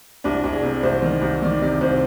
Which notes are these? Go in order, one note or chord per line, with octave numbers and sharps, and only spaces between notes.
C2 D4
C2
G#4
C3
C2 C5
D#3
C2
D#3 D5
C3 D5
C2 C5